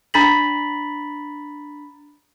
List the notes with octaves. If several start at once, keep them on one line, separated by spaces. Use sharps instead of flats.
D4 A#5 B5 A6 B6 F#7